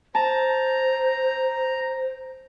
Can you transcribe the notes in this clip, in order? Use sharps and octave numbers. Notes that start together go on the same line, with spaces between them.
C5 A5 A#5